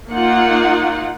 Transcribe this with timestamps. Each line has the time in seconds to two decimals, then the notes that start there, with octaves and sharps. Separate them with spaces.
0.11 A#3 D#4 F4 F#5